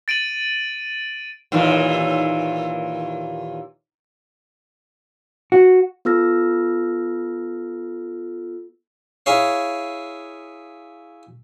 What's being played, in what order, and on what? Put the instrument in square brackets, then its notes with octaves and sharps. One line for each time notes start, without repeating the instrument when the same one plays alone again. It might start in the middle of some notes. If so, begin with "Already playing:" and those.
[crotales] A6 D7 D#7 F#7
[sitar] D#2 A#2 E3
[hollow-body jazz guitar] F#4
[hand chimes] B3 F4 A4 E6 F6 A#6
[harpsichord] E4 G#4 C#5 F5